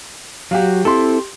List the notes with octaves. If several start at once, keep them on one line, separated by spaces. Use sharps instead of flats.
F#3 F#4 G4 F5
C4 E4 G4 A4 C6